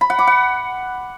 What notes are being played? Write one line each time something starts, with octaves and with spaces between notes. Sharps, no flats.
B5
F#5
D6
F#5